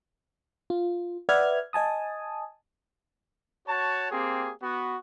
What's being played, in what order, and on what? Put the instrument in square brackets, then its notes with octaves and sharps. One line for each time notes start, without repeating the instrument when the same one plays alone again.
[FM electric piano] F4
B4 D5 E5 F#5 F6 G#6
D#5 G#5 A5 D#6
[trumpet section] F#4 C#5 A5
A#3 C4 G4 G#4
B3 F#4